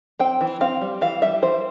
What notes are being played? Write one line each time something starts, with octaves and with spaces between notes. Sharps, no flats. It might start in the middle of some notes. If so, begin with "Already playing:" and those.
C4 G5
E3
C4 F5
G3
E3 F5
G3 E5
E3 C5